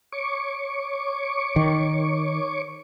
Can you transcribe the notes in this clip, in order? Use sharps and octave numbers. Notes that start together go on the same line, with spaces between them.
C#5 C#6 D6
D#3